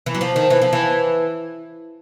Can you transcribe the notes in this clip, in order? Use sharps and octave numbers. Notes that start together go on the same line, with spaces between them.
E3
F#3
F3
D#3
E3
F3
E3